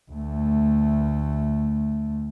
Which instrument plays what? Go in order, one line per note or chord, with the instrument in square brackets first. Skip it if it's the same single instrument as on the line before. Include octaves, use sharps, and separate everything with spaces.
[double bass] D2 A3